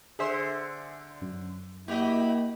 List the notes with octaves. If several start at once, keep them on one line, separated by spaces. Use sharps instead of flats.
D3 G#4 C5 E5
F#2
A#3 E4 F#4 G4 D#5 B5